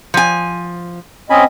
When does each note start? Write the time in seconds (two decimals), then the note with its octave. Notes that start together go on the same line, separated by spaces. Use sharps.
0.14 F3 G#5
1.30 C4 C#4 D#5 G#5 B5